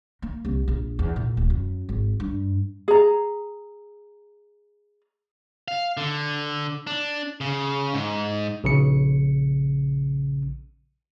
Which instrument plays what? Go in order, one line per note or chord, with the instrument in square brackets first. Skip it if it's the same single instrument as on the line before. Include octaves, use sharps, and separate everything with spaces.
[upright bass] A#3
C2
A#1
E2
A#2
D1
F#2
G#1
G2
[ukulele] G#4 A#5
[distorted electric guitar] F5
D3
D4
C#3
G#2
[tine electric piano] A#1 C#3 C#7